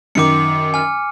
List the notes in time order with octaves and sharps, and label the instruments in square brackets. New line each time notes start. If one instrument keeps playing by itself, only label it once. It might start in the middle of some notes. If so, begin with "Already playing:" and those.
[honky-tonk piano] F#2 D#3 [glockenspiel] D6 C#7
[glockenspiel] G#5 F6